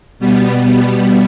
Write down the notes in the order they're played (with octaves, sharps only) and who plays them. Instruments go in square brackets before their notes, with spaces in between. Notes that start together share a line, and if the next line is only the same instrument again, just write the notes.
[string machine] B2 G3 B3